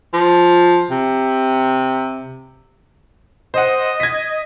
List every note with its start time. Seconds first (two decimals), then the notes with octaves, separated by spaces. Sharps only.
0.13 F3
0.90 C3
3.54 C5 D#5 F#5
4.00 G#6 B6